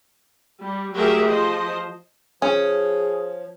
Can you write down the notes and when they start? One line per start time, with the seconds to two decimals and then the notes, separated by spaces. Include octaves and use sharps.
0.61 G3
0.94 F#3 A3 G4 G#4 A#4 E5
1.29 F3 C5 D#5
2.42 F3 C#4 G#4